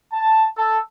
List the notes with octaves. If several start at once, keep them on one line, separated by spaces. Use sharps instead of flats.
A5
A4